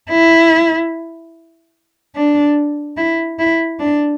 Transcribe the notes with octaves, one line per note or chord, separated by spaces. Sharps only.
E4
D4
E4
E4
D4